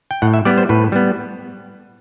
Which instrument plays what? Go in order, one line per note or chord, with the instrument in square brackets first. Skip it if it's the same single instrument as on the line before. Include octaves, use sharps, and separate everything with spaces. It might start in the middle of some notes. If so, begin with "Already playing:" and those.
[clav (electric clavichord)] G5
A2 F#5
E5
G3 B3 D5
C5
A2 B4
G3 B3